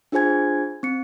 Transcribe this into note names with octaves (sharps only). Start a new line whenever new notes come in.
D4 F4 G#4 C5 G#5 G#6
C4 C#7